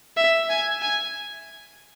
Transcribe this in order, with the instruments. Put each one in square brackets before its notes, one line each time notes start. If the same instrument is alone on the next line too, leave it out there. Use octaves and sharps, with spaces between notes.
[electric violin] E5
G#5
G#5